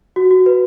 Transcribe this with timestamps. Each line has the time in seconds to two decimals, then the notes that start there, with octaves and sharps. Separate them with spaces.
0.16 F#4
0.31 F#4
0.46 B4